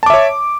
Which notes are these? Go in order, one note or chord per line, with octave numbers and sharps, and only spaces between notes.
C#5 E5 A5 D6